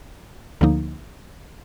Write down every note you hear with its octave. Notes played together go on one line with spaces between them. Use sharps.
D2 D3 F3 A#3 D#4